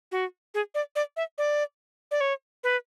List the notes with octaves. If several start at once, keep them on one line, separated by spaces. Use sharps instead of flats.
F#4
G#4
D5
D5
E5
D5
D5
C#5
B4